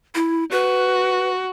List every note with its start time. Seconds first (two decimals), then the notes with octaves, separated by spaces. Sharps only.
0.15 E4
0.51 F#4 B4